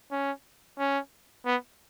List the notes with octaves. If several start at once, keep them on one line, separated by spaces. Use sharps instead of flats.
C#4
C#4
B3